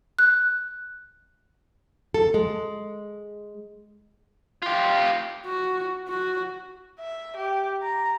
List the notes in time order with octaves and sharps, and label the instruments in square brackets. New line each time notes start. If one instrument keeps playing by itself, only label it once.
[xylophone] F#6
[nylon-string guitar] A4
G#3
[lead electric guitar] F4 G4
[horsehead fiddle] F#4
F#4
[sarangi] E5
G4
A#5